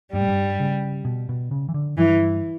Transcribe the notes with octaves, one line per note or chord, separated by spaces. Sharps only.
G2 G3
A2
G2
C#3
B2
B2
C#3
E3
D3
G2 E3